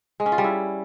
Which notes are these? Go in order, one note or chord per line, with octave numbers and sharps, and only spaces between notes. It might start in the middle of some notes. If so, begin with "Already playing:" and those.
G#3
C#4
F4
G3
E4